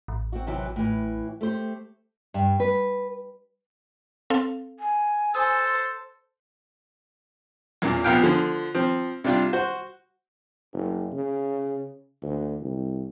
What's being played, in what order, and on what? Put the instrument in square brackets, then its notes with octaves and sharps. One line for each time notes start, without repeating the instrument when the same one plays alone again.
[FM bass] A1
[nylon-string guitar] C4 F#4
C3 E3 F#3
A2 E3
A3 G4 C5
G2
B4
[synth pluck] C4 A4 F5
[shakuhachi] G#5
[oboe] A4 [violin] C5 [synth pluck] D#6
[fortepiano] E2 A#2 C#3
A#1 F2 A#2 B3 F5 G5
D3 F3
F3 C4
C3 G3 D4 F4
F#4 C5
[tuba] F#1
C#3
D2
C2